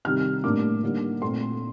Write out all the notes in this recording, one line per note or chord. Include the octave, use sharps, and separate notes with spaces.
C3 D#3 G3 C4 F6
A2 G3 A#3 D4 D6
D3 G3 A#3 D#4
A#2 A3 C4 C6